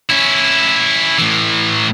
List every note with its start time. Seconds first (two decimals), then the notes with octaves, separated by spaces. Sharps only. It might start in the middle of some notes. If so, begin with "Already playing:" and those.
0.09 C#4 E4
1.18 A2 E3